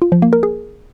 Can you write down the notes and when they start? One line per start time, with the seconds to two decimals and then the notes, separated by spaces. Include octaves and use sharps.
0.02 F4
0.12 F3
0.22 A#3
0.33 A#4
0.43 G#4